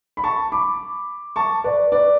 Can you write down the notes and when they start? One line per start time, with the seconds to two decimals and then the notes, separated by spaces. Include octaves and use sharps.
0.17 B5
0.24 A5 C#6
0.52 B5 D6
1.36 A5 C#6
1.64 B4 D5
1.92 B4 D5